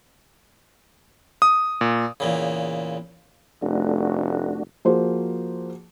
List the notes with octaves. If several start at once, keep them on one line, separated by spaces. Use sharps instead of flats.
D#6
A#2
E2 A#2 C#3
F1 A3 D4 F#4
F3 A#3 F#4 G#4 C5